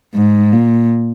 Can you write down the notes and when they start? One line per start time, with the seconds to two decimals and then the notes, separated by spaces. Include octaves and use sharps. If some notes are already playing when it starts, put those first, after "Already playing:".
0.14 G#2
0.53 A#2